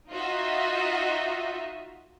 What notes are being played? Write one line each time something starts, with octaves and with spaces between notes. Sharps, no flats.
D#4 F4 F#4 D#5 E5